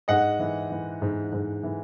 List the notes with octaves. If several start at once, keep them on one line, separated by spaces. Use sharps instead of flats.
G#2 D#5 F#5
E3
E3
G#2
G#2
E3